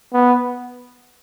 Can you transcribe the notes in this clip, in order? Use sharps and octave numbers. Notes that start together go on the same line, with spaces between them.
B3